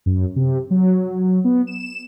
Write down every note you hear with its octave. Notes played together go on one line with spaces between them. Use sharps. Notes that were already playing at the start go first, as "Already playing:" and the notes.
F#2
C3
F#3
B3
E7